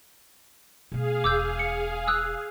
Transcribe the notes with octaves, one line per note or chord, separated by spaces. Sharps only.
B2 A3 G#4 F5
E1 D6 E6 G6
C#7
D#6 E6 F#6